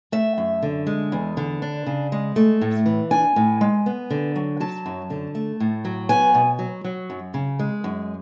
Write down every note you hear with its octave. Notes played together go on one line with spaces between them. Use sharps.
A3 E5
F#2
D3
G#3
E2
D3
D4
C#3
G#3
A3
A2
E3
D4 G#5
A2
G#3
B3
D3
F#3
F#3 A5
F#2
D3
A3
A2
F#3
B3 G#5
B2
F#3
F#3
F#2
C#3
G#3
F#2